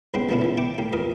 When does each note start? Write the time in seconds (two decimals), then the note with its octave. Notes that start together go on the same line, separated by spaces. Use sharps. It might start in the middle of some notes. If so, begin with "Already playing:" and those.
0.14 C2 G#2 C#3 B3 C5 G5
0.29 D3 F3 A#3 B3 C#4 E4
0.41 C#3 E3
0.57 E4 G5 C#6 D6
0.78 A2 A#3 G4
0.93 F2 E3 A#4 D#6